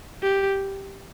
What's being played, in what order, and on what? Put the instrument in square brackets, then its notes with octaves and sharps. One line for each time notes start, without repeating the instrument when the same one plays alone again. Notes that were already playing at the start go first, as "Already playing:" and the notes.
[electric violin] G4